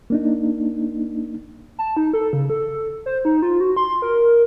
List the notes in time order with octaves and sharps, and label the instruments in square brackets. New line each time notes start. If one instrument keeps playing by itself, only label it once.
[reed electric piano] A#3 D4 D#4
[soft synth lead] A5
D#4
A4
C#3
A4
C5
D#4
F4
F#4
C6
A#4